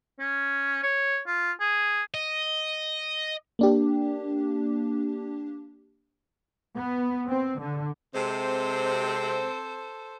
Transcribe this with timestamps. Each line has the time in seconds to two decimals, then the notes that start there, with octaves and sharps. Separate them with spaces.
0.20 C#4
0.83 C#5
1.27 F4
1.60 G#4
2.14 D#5
3.59 A#3 D4 G4
6.76 B3
7.28 C4
7.59 D3
8.14 C3 G#3 C4 A4 C5